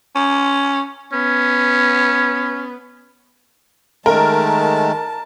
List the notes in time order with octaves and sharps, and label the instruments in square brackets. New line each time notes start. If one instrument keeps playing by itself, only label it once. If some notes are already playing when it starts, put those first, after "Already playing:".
[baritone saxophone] C#4
[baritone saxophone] B3 [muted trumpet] C#4
[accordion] D#3 G#3 A3 [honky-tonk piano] A#4 [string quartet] A5